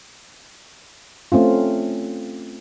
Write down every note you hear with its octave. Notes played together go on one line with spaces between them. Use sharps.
A3 C4 C#4 F4